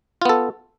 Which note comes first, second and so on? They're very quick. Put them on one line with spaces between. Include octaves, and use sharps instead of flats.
F4 B3 A4